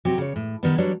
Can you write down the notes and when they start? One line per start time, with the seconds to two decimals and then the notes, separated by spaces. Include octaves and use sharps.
0.05 C3 F#3 F#4 G4
0.18 C#3 C#5
0.36 A2
0.63 D#3 G3 B3
0.78 F#3 G3 D4 C#5